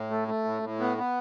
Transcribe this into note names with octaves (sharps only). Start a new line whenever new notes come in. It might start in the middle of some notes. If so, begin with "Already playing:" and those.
Already playing: A2
A3
A3
A2
A2
B3
B3